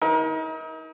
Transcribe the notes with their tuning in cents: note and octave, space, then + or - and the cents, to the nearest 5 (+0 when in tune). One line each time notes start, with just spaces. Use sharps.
D#4 +40 A#4 +30